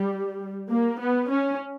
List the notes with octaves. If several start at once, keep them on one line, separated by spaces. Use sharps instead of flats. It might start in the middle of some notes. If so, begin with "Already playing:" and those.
Already playing: G3
A#3
B3
C#4